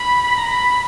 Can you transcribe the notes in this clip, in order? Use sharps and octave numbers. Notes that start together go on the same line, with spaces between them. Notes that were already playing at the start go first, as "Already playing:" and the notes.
Already playing: B5
A#5
B5